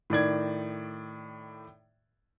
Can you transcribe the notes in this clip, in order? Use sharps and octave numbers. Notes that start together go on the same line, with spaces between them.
A2 D#3 D5 G#6